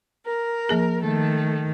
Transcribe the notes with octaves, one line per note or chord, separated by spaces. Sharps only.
A#4
F3 A#3 G#4
D#3 A3 A4